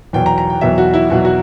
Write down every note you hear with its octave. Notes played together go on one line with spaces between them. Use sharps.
E2 B2 F#3 G5
A#5
A#5
G5
E2 B2 F#3 E5
F#4
E4
E2 B2 F#3 F#4
F#4